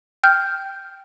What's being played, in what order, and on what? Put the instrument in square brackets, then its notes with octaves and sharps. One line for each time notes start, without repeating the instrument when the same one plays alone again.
[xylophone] G5 F6 G6